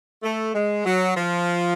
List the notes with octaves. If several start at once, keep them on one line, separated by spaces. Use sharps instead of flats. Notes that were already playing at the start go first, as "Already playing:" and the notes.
A3
G#3
F#3
F3